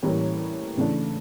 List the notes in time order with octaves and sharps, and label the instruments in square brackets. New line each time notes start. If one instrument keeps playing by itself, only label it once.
[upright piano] A2 E3 G3 A#3 C#4
C#3 E3 A3 D4